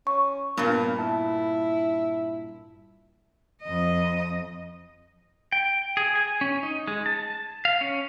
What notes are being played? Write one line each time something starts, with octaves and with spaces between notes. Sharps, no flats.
C#4 C#6
G2 A#2 B3 A#4
E4 A5
F2 D#5
G5
G#4
G#5
C#4
D#4
G#3
A5
F5
C#4